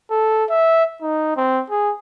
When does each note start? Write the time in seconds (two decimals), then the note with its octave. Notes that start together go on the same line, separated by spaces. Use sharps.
0.11 A4
0.50 E5
1.02 D#4
1.37 C4
1.70 G#4